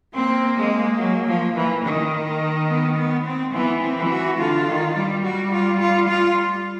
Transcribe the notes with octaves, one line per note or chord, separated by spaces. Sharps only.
A#3 C4
G#3
F#3
F3
E3
D#3
B3
B3
C4
E3 B3
C4
E3
F#4
D3 F4
D#3
G3
G3 F#4
F4
F4
F4